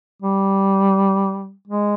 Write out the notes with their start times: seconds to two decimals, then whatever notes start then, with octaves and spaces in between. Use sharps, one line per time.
0.23 G3
1.68 G#3